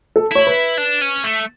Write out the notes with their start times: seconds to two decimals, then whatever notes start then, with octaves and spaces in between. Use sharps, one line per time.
0.16 A4
0.31 E4 C#5
0.47 B4
0.77 D4
1.01 C#4
1.24 A3